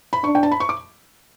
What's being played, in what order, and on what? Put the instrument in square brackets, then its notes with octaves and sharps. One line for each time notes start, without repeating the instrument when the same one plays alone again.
[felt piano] B5
[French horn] D4 [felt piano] C#6
[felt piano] G5
A5
B5
C#6
D6